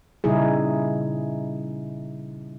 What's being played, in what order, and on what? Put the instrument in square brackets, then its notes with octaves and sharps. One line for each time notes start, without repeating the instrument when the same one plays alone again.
[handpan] A#2 C#3 G3 D#4 E4 G#4